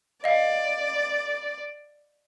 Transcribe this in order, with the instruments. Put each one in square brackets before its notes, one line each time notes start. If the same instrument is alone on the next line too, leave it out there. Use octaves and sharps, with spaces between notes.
[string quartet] D5 [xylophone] D#5 F5